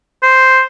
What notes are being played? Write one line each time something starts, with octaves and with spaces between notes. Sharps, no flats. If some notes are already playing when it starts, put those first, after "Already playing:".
C5